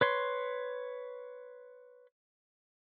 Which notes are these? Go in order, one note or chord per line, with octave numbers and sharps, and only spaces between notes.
B4 C#5 C6